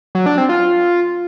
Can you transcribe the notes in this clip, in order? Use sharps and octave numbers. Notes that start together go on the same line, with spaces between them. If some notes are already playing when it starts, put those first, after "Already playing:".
F#3
D4
C4
F4